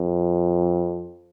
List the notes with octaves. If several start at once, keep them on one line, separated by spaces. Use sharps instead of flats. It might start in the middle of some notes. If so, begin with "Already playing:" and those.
Already playing: F2